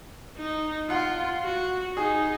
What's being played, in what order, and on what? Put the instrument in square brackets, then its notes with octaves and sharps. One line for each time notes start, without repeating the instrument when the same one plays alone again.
[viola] D#4
[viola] F4 [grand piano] F#5
[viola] F#4
[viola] D#4 [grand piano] G#4